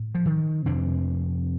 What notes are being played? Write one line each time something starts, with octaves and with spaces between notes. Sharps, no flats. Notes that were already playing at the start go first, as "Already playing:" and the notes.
Already playing: A2
F3
D#3
F2 C3 D4